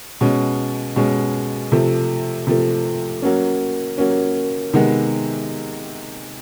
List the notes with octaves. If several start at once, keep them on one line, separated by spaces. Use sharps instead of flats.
B2 G#3 C#4
B2 G#3 C#4
C3 F3 A3
C3 F3 A3
F#3 A#3 C#4
F#3 A#3 C#4
C3 D#3 G#3 B3